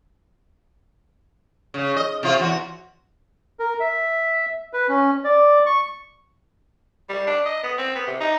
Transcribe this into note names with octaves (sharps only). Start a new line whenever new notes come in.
C#3
D#5
C3 F4
E2 F#4
A#4
E5
B4
C#4
D5
C#6
G3
D4
D#5
B3
C4
B3
C3
D#4